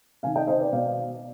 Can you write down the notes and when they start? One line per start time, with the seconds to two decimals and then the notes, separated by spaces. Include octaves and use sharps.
0.23 C3 D#3 F5 G#5
0.36 D#5 G5
0.47 C5 D#5
0.60 B4 D5
0.72 B2 D5 F5